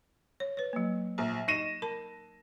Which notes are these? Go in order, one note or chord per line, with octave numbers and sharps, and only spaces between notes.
C#5
B4 C#5
F#3 A#3
A#1 A#5
D#4 D#5 A#6 D#7 E7
A#4 A5 B5